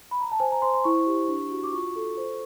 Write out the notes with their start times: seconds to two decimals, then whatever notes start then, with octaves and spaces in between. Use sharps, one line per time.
0.11 B5
0.21 A#5
0.32 A5
0.40 C5 G#5
0.52 A#5
0.62 C5 C6
0.74 C6
0.84 E4 C#6
1.07 G4
1.28 D4
1.51 F#4
1.63 D6
1.73 F4 C#6
1.96 A4
2.17 C5